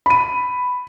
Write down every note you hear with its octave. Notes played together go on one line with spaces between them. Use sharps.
B5 D#7